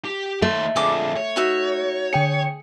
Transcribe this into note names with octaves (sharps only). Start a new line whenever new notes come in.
G4
D#2 A3 C6
F2 D3 G#4 A4 D6
C#5
D#4 F#4 E5
D3 G#4 G5 C#7